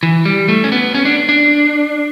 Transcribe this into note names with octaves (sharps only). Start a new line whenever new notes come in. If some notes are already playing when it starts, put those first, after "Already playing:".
E3
G3
A3
C#4
B3
C#4
D4
D4